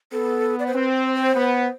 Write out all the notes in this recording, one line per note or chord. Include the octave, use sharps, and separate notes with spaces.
B3 A4
D5
C5
C4 B4
C5
C5
B3